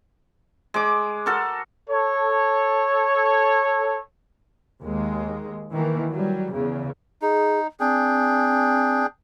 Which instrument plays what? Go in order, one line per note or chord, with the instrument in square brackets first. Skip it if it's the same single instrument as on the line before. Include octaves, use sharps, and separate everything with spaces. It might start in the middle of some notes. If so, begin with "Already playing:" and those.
[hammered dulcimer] G#3 D6
F#4 A4 A#4
[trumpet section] A4 C#5
[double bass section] D#2 G#3
D#3 E3 A#3
F#3 G3
E2 C#3
[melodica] D#4 [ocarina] G#4
[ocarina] C4 [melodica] D4 G#4 G5